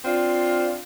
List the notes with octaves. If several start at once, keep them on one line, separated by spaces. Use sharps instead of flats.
C4 D4 F4